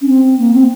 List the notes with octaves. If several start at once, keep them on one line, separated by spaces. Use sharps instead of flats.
C#4
C4
A#3
C4